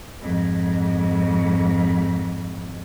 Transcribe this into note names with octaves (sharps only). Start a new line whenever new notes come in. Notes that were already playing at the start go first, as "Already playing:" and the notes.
F2 G#2